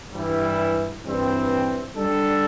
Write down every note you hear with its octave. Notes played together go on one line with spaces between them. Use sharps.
G2 E3 G3 E4
G2 E3 G3 C4
G3 D4 A4